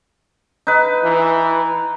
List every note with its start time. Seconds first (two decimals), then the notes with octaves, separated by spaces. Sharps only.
0.67 D#4 B4
1.04 E3